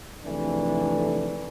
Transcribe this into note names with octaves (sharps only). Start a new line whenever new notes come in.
F2 G#2 C3 E3 A3 D4